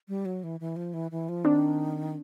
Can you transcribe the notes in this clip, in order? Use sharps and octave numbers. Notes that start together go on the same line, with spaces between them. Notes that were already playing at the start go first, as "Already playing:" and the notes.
G3
F#3
E3
E3
F3
E3
E3
F3
D#3 C4 D4